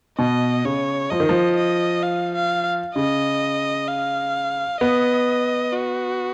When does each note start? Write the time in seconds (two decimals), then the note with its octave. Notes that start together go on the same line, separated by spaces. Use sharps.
0.19 B2 D#5
0.65 C#3 C#5
1.11 F3 D#5
1.20 D#3
1.29 F3
1.57 D#5
2.03 F5
2.35 F5
2.96 C#3 D#5
3.88 F5
4.81 B3 D#5
5.73 F#4